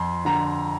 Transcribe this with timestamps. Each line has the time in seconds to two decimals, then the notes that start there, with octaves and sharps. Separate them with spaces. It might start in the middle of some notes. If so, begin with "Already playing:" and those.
Already playing: F2 C6
0.25 D3 A#5